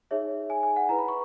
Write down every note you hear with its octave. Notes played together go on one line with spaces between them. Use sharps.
D#4 G#4 C#5 E5
G#5
G#5
F#5
E4 B4 A#5
B5
C#6